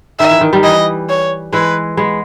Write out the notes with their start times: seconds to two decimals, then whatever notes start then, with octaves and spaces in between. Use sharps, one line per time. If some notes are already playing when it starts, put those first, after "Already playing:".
0.19 D#3 E5
0.31 E3
0.41 D#3
0.53 D#3 G3
0.63 E3 D#5
1.09 C#5
1.53 E3 G#3 B4
1.97 G#3 B3